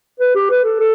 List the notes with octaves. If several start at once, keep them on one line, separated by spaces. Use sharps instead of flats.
B4
G4
B4
A4
A4